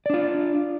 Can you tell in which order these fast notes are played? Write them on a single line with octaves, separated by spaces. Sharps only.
D5 D4 F4